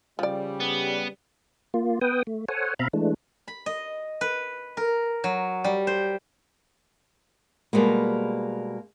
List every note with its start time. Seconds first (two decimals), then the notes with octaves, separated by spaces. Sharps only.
0.19 C#3 F3 G3 D5
0.60 B3
1.74 A#3 F4
2.01 B3 B4 G5 D#6
2.27 A3
2.49 A4 C5 C#5 F#5 G#5
2.79 B2 C4 E5 F5 A#5 B5
2.93 E3 G#3 A3 D4
3.48 B5
3.66 D#5
4.21 B4
4.77 A#4
5.24 F#3
5.64 G3
5.87 C5
7.73 B2 G3 G#3 A#3